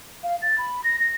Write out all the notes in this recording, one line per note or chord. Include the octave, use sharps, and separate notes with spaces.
F5
A6
B5
A#6
A#6